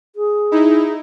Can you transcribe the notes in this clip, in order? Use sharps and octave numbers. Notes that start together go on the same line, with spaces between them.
G#4
D#4 E4